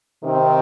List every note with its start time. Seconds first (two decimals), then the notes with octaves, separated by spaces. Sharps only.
0.22 C3 D#3 C4